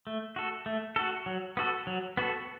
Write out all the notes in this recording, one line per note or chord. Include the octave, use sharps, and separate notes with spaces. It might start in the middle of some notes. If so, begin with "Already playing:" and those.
A3
F#4 A4
A3
F#4 A4
F#3
B3 F#4 A4
F#3
B3 F#4 A4